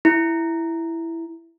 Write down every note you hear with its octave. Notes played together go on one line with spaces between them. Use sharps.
E4